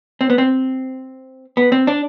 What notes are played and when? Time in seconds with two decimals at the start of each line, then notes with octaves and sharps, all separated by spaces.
0.21 C4
0.30 B3
0.38 C4
1.57 B3
1.72 C4
1.87 D4